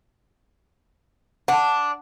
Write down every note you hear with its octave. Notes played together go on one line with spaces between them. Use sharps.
D4 F#5 A5